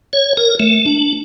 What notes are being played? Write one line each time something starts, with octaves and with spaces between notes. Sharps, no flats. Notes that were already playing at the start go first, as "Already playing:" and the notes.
C#5
A#4
A3
D4